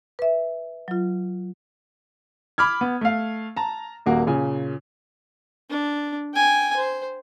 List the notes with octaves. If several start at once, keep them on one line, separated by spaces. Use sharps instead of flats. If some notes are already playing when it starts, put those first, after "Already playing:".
B4 E5
F#3 F4
B5 D6 F6 G#6
B3
A3 F5
A5 A#5
D#1 A#3 F#4
A#2 C#3 G#5
D4
G5 G#5
C5